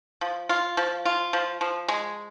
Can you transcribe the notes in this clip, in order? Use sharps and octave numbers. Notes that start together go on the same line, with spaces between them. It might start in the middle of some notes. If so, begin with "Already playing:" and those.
F3
F4
F3
F4
F3
F3
G#3